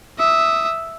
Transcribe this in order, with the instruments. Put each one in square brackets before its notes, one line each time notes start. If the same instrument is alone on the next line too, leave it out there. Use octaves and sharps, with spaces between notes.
[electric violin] E5 D#6